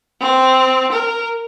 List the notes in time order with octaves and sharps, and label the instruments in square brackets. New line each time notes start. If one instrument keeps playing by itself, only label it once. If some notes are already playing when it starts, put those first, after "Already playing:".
[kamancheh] C4
A#4